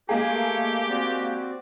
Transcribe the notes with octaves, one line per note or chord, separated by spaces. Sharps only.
G#3 A#3 G4 G#4 A#4 G#5
A3 C#6
C4 F#4 D5